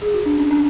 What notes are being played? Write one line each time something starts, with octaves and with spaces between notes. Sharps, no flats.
G#4
F#4
D4
C#4
D4